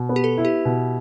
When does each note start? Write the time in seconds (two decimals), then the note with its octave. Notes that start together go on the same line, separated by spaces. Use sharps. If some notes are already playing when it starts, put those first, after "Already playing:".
Already playing: B2
0.09 B3
0.16 G4
0.24 A4
0.38 E4
0.45 G4
0.65 B2